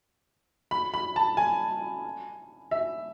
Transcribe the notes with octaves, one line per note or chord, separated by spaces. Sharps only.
B5
B5
A5
G#5
E5